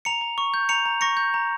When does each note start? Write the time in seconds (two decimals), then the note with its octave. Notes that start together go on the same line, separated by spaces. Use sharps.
0.05 A#5 C#7 F7
0.21 A#5
0.38 C#6
0.54 G6
0.69 A#5 C#7 F7
0.86 A#5
1.01 C#6 A#6 C#7
1.17 G6
1.34 A#5